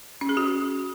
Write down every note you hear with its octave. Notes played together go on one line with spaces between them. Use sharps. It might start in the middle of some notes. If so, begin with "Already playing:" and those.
C#4
G#4
F#4